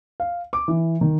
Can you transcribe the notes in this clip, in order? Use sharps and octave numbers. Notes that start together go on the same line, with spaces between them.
F5
D6
E3
D#3